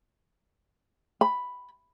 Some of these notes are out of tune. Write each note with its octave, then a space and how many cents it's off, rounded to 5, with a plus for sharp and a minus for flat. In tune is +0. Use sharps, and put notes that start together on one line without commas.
B5 +0